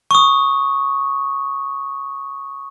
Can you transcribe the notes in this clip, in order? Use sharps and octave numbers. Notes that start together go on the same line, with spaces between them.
C#6 D#6